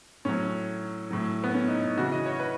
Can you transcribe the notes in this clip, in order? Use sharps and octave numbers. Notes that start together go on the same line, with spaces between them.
A2 F#3 C#4
A2 F#3
B3
C#4
D#4
D#4
C#3 E3 F#4
D#5
C#5
B4